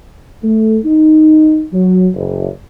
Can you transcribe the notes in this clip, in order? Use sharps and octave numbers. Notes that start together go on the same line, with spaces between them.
A3
D#4
F#3
F#1